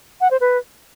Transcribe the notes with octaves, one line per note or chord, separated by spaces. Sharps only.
F#5
C5
B4